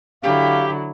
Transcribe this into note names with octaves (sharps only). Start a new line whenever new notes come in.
D3 F#3 E4 G4 F5